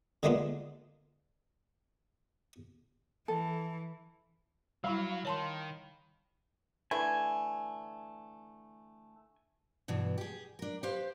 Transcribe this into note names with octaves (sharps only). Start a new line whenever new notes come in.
D3 G#3 A#3 B3 D4 F4
E3 A4
F#3 G3 E4 F5 B5
D#3 C#5 A5 C6
D3 E3 A3 G#5
G2 B2 E3
G4 G#4
D4 A#4
G4 B4 C5 F5